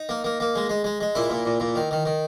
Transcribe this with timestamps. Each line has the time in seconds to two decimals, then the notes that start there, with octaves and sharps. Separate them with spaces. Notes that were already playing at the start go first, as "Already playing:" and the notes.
Already playing: D#4
0.09 A#3
0.24 A#3
0.40 A#3
0.55 G#3
0.69 G#3
0.84 G#3
1.01 G#3
1.15 A#2 E4
1.30 A#2
1.46 A#2
1.60 A#2
1.76 D#3
1.91 D#3
2.05 D#3